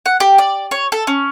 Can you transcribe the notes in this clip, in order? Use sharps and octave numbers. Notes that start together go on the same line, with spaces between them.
F#5
G4
D5
C#5
A4
C#4